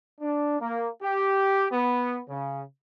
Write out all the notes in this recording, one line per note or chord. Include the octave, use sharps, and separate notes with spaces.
D4
A#3
G4
B3
C#3